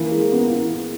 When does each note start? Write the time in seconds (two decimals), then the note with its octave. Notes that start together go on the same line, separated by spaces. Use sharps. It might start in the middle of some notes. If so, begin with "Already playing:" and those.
Already playing: E3 A#3
0.11 G#3
0.32 B3
0.51 E3